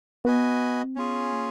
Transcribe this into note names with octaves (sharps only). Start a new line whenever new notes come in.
B3 F#4 B4 D#5 G#5
C4
B3 C#4 F4 G#4
A#3